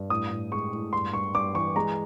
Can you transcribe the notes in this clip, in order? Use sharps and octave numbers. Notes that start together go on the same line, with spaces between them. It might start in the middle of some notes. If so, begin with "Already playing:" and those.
Already playing: G2
A2 D#6
A2
G#3 C#6
A2
G2 C6
G2 C#6
G2 D6
E3 C#6
G#3 A#5